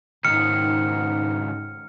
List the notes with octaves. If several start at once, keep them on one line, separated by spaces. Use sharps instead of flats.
C#2 G#2 D#3 F6 C#7